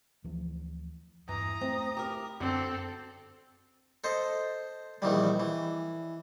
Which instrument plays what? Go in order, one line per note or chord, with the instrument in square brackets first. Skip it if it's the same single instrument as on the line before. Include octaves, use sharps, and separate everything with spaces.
[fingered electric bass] D2 E3 F3
[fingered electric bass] E2 G2 [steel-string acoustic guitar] E3 [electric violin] A#5 D#6
[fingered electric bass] A3 [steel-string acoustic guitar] C4
[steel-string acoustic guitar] E4 G4 A#4
[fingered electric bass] F#2 [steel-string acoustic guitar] D3 F#4 [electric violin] C4 A4
[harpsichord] A4 C5 D#5
A#1 D#3 E3 G3
E3